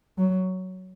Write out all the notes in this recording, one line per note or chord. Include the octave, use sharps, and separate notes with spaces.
F#3